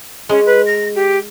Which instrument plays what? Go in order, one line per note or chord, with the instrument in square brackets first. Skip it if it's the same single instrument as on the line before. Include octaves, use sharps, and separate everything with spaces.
[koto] G#3 [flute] C#4
[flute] B4
A#6
G4